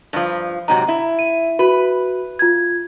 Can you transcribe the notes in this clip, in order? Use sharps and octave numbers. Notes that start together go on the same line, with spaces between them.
G2 F3
G#2 C3 F#3 A#5
E4
D#7
F#4 B4
F4 G#6